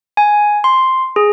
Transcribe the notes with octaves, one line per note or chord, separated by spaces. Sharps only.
G#5
C6
G#4